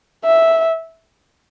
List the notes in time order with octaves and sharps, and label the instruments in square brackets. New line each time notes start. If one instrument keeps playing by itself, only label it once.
[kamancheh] E5